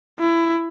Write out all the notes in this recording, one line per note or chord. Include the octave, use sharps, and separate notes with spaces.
E4